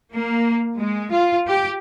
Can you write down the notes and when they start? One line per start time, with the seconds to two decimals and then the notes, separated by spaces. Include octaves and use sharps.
0.13 A#3
0.77 G#3
1.11 F4
1.47 G4